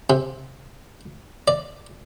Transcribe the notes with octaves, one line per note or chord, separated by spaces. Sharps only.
C3
D5